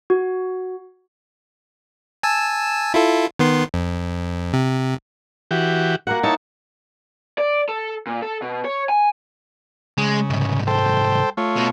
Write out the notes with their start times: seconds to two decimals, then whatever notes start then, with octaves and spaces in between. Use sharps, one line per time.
0.10 F#4
2.23 G#5 A5 E6
2.94 E4 F4 A4
3.39 D#3 B3 C6
3.74 F2
4.53 C3
5.51 E3 F#4 G4
6.07 A#3 F#4 A#4 F#5
6.24 D#4 E4 C#5 A5
7.38 D5
7.69 A4
8.07 A#2
8.22 A4
8.42 B2
8.65 C#5
8.89 G#5
9.98 C#3 G#3
10.30 C2 G#2
10.67 A4 C5 G5
11.37 A3 F4 C#5
11.56 B2